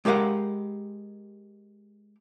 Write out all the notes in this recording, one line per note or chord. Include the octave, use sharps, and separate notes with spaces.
G#3 G4 A#4 F5 F#5